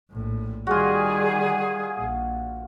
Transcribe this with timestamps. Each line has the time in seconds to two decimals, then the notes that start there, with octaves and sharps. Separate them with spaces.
0.10 A#1 A2
0.67 D#3 G3 F4 F#4 G#4
1.99 A#1